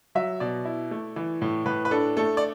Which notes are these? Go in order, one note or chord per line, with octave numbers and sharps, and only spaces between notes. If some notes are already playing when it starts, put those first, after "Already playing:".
F#3 E5
B2 D5
E4
A3
E3
A2
A2 B4
B4
D4 A4
A3 A4
D5